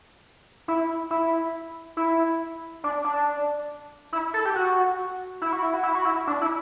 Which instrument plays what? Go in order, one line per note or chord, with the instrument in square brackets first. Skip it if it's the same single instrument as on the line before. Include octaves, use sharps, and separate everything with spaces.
[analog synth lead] E4
E4
E4
D4
D4
E4
A4
G4
F#4
E4
F#4
E4
F#4
E4
F#4
E4
D4
E4